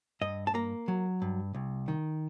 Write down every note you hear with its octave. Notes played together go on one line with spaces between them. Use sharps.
G2 D#5
A5
A#3 A#5
F#3
G2
C2
D#3